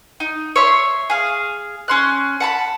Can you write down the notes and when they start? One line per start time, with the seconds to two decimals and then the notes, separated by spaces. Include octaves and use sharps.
0.20 D#4
0.56 C#5 E5 C6
1.10 G#4 F5
1.88 C#4 C6 F#6
2.40 F#5 A5 B5